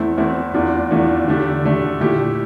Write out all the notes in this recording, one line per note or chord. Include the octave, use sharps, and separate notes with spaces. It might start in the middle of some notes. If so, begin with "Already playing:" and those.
Already playing: E2 E3 A3 C4 E4
E2 E3 A3 C4 E4
E2 E3 A3 D4 F4
E2 E3 A3 D4 F4
D3 A3 D4 G4
D3 A3 D4 G4
A#2 A3 E4 G4